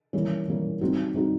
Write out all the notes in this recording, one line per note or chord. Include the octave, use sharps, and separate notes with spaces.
E3 G3 A#3 C#4
E3 G3 A#3 C#4
G3 C4 D#4 F#4
G3 C4 D#4 F#4